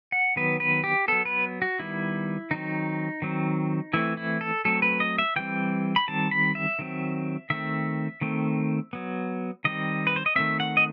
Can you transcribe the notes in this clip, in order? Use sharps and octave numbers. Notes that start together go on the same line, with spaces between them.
F#5
D#3 F#3 B3 B4
B4
G4
F#3 B3 A4
B4
F#4
D#3 G3 B3 E4
D#3 F#3 C4 D#4
D#3 F#3 C4
E3 A3 C4 E4
E4
A4
F#3 A3 C4 A4
B4
D#5
E5
E3 G3 C4 G5
B5
D#3 G3 C4 A5
B5
E5
D#3 F#3 C4
D#3 A3 C4 E5
D#3 A3 C4
F#3 B3
D#3 G3 C4 D#5
B4
C5
D#5
D#3 A3 C4 E5
F#5
D#5